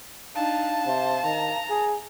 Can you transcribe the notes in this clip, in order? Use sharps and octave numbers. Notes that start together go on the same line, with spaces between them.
D4 D#4 F5 A5
C3 C5
D#3 A#5
G#4